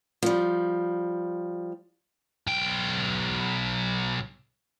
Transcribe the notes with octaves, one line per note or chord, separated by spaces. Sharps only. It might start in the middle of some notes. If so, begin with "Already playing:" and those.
F3 G3
B1 G5